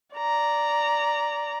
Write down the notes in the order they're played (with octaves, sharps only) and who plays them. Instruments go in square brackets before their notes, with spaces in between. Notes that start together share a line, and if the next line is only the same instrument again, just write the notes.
[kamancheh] D5 A#5